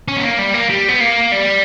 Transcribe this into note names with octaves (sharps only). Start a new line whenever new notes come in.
C#4
B3
A#3
G3
A#3
G3
B3
A#3
G3